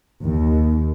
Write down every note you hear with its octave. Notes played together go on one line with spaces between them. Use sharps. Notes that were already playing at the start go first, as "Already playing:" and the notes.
D#2